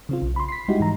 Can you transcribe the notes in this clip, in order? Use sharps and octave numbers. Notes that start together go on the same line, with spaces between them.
C#3 C4 F4
B1
B5 C6
B6 C7
G3 G#3 D#4 E4 F#4 G4
G#2 E3 A#5